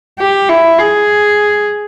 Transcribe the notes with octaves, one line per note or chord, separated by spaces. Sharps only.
G4
E4
G#4